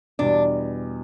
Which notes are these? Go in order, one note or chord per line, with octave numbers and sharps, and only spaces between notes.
E2 B2 G3 D4